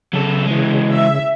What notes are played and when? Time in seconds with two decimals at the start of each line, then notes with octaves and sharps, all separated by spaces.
0.14 C#3 F#3 A4
0.47 E3 G#3
0.92 E5